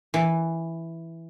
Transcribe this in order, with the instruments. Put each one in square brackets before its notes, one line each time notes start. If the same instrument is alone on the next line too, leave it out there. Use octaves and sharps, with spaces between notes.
[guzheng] E3